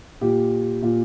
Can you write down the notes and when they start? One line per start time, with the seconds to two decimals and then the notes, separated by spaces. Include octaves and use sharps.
0.21 A#2 G4
0.82 A#2